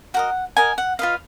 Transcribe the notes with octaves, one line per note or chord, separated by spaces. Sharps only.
F#4 A#4 D#5 F#5
F#4 A#4 D#5 G#5
F#5
F4 B4 D#5 F5